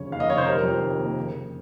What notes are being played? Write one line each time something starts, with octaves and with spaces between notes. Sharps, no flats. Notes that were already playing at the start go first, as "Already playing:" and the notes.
Already playing: F1 C#3 C#5
D#2 F5
D#5
F1 C#5
C5
G3 A#4
F2
D#3
A#3
C#3
F1